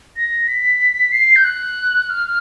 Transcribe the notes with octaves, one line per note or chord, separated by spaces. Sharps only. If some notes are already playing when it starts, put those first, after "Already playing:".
A#6
B6
C7
G6
F#6
F6